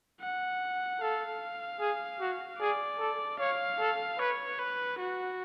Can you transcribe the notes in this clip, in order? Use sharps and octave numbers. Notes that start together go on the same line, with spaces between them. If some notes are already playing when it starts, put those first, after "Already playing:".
F#5
A4 F5
G#4
F#4
G#4 D5
A4
C#5 F5
A4
B4 C#5
B4
F#4